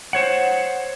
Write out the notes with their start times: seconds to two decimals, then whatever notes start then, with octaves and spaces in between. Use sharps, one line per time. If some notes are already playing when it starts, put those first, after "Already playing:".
0.13 C5 C#5 F#5